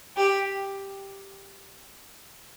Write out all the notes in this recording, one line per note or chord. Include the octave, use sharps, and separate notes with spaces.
G4